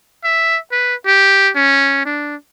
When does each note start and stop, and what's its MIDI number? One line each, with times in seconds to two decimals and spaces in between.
0.24 0.58 76
0.72 0.95 71
1.06 1.50 67
1.56 2.04 61
2.05 2.35 62